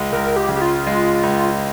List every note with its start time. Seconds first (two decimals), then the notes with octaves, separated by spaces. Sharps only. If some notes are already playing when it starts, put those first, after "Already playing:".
Already playing: C#2 G#3
0.12 C#2 A#4
0.36 G4
0.49 C#3
0.56 G4
0.61 F4
0.87 G#3
1.23 C#2